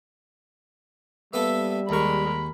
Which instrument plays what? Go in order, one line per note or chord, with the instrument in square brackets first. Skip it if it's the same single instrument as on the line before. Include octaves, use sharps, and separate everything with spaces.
[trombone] G3 [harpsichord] A#3 B3 A4 [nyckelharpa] E5
[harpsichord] D#2 C#6 [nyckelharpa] G#3 A#4 [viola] B5